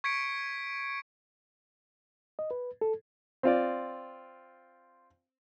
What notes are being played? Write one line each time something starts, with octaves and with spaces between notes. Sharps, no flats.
C#6 G#6 B6 C#7 D7
D#5
B4
A4
C4 F4 D5